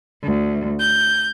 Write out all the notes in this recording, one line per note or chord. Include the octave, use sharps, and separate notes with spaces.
D2
G6